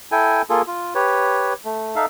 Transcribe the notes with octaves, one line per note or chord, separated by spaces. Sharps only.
E4 A4 G5 G#5
A#3 F4 G#4 A4
F4
G4 B4 C#5
A3
D#4 A4 E5 F5